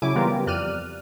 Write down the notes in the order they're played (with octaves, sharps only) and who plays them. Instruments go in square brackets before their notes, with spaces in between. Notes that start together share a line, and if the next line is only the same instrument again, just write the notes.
[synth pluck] C#3 F#3 E4 G#5 D6 D7
E3 G3 B3 F4 G4 A#4
F2 D5 F6 F#6 D#7